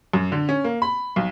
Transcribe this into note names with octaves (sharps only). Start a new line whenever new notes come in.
F#2
D3
C#4
A#3
B5
B1